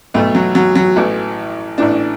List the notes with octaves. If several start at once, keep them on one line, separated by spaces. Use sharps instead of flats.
B1 B2 A3
F#3
F#3
F#3
A1 A2 E3
A1 A2 E3 D4